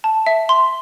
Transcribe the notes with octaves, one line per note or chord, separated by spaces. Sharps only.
A5
E5
C6